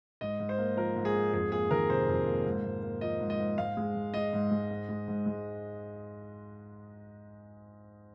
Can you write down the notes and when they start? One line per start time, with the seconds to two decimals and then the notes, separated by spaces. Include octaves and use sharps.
0.21 G#2 D#5
0.39 G#2
0.49 C5
0.58 A#3
0.77 F3 A#4
0.96 G#2
1.05 G#4
1.15 G#2
1.33 F2 G#4
1.52 A#3 G#4
1.71 D#3 A#4
1.89 C3 C5
2.08 F2
2.27 A#3
2.46 G#2
2.64 G#2
2.82 A#3
3.01 F3 D#5
3.20 G#2
3.30 D#5
3.39 G#2
3.58 G#2 F5
3.77 G#3
3.95 G#2
4.14 G#3 D#5
4.33 G#2
4.51 G#3
4.71 G#2
4.89 G#3
5.08 G#2
5.26 G#3